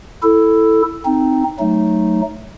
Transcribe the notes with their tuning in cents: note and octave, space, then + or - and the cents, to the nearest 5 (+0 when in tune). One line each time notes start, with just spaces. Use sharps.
E4 +0 A4 +0
C4 +0 D#4 +0
F#3 +0 A3 +0 D#4 +0